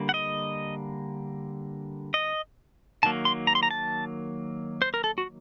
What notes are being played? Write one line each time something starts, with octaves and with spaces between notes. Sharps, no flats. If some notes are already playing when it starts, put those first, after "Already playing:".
Already playing: D3 G3 A#3
F#5
D#5
D#5
D#3 F#3 A#3 A5
C6
A#5
C6
A#5
A5
C5
A#4
A4
F#4